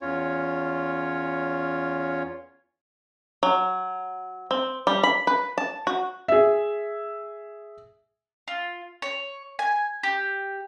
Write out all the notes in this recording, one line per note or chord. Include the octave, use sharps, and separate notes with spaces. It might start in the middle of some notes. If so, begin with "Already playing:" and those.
E2 C#4 F4 C#5
F#3
C4
G3
B5
B4
A5
F#4
G#4 E5
F4
C#5
G#5
G4